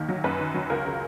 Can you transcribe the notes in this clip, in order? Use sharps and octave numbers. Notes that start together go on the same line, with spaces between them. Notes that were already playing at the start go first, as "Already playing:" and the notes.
Already playing: D#2 D#3
F#3
F#2 B4
D#3
F#3
C#2 A#4
C#3